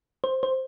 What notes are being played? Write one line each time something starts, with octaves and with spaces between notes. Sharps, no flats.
C5
C5